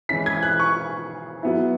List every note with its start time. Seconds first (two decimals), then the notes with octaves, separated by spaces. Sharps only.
0.09 E3 G#3 C#4 E4 B6
0.26 G#6
0.43 F#6
0.59 C#6
1.43 F#3 B3 E4